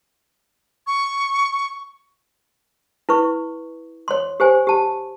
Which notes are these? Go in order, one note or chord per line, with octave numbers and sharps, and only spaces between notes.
C#6
E4 B4 C#6
C#5 C6
G4 C5 G#5
G4 A5